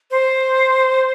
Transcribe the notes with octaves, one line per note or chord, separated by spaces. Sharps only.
C5